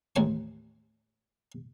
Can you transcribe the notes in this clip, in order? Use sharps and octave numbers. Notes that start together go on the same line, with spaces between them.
A1 D#2 G#3 G#5 C#6